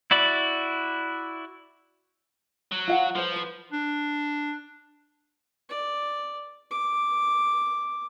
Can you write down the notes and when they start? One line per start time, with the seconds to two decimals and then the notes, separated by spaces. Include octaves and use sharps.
0.11 E4 F#4 D5 B5
2.72 F#3
2.88 F4 F5 F#5
3.15 F3 B4 C5
3.36 B4
3.72 D4
5.70 D5
6.71 D6